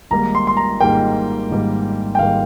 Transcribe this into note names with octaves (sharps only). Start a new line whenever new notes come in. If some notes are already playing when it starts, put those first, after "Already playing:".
G#1 G#2 G3 A#3 A#5
C6
C6
A#5
G#1 G#2 G3 A#3 G5
G#1 G#2 G3 A#3
G5
G#1 G#2 G3 A#3 F5